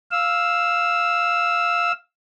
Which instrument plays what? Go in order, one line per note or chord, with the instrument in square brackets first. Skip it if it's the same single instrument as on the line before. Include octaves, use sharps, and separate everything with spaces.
[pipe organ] F5 E6